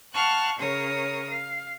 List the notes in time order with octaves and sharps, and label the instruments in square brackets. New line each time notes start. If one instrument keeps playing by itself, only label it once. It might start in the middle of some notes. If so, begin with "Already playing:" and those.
[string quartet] F5 F#5 A5 C#6 F6 F#6
C#3 A#4 C#5 D#6
F5